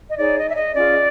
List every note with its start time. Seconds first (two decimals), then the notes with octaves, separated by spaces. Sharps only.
0.09 D#5
0.18 D#4 G#4 C#5 D5
0.38 D#5
0.49 E5
0.57 D#5
0.75 C#4 F4 G#4 D5